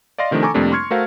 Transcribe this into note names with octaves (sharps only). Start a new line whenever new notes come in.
D5 D#5 F5 C6 A#6
C3 D#3 F3 A3 D4
A4 G#5 A#5 C#6 D6
F2 C3 G3 A3 A#3 D4
C6 C#6 F6 G#6 C#7
A3 F#4 A4 A#4 C5 F5